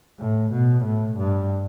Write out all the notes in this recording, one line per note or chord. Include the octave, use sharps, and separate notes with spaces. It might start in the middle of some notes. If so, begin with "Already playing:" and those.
A2
B2
A2
G2